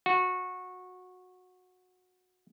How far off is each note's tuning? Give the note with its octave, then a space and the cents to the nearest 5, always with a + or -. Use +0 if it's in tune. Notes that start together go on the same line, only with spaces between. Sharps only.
F#4 -20